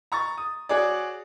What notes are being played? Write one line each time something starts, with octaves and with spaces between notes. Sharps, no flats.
A#5 C#6 A6
D#6
F#4 G#4 C#5 D5